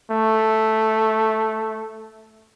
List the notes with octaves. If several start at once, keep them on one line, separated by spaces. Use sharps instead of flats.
A3